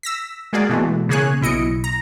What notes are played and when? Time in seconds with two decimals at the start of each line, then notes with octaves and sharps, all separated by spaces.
0.03 E6 A#6 B6
0.53 G#3 A#3 F#4 G#4 D5
0.69 B2 E3 G#3 A3
1.09 C#3 A#3 G#4 C#5 G#5 F#6
1.41 B1 E4 D#5 C#7 D7
1.84 A#5